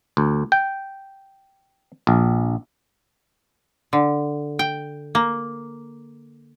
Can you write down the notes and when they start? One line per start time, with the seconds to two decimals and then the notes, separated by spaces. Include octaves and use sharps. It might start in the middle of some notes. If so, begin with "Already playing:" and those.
0.17 D2
0.52 G5
2.07 A#1
3.93 D3
4.59 G5
5.15 A#3